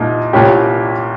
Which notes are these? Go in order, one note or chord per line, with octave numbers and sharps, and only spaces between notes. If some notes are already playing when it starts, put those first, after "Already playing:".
Already playing: C2 A#2 D#4
C2 A#2 G3 C#4 G4